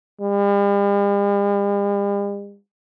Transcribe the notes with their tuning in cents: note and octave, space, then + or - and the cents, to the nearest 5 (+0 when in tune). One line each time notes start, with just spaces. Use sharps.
G3 +45